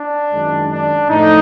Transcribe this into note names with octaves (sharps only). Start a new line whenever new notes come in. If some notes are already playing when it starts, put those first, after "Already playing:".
Already playing: D4
F#2 D#3 G#3
D4
A2 F3 A3 D#4